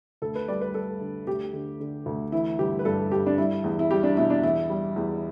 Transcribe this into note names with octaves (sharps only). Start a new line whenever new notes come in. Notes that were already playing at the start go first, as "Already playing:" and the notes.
D2 A4
B4
G3 D5
B4
G3 A4
D3
D2 G4
D3
D3
D2
E3 E4
G1 G4
B4
G2 A4
G2 G4
D4
G3 E4
E2
E4
G3 G4
D4
B2 E4
D4
E2 E4
G3
E2